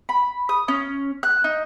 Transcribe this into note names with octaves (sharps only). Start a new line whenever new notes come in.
B5
D#6
C#4
F#6
D#4